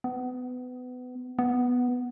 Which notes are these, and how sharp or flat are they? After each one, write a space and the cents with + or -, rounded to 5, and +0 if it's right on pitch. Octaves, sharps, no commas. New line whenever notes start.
B3 +25
B3 +0